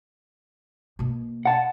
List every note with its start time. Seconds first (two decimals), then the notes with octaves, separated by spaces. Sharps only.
0.99 B2 A#3
1.46 F#5 A5